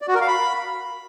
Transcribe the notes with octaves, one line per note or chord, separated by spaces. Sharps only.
D5
F#4
A#4
F5
B5